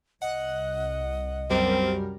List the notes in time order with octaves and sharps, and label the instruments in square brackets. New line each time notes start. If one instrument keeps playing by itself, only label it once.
[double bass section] C2 [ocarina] D#5 [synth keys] F#5
[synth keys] F#2 G3 A#4 [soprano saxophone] C4